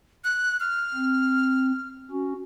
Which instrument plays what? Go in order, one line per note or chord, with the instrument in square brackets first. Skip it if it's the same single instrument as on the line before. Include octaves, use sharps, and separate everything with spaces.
[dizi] F#6
F6
[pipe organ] C4
C#4 F#4